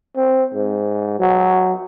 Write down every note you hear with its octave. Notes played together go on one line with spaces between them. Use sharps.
C4
G#2
F#3